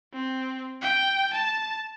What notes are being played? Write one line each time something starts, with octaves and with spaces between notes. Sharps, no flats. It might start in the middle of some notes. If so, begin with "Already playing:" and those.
C4
G5
A5